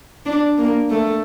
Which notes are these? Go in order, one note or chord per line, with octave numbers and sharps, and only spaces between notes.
D4
A#3
A3